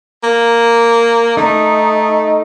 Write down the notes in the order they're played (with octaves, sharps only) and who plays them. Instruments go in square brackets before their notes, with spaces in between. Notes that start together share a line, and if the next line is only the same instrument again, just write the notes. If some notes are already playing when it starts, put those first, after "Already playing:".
[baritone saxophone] A#3
[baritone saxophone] A3 [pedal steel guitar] D#4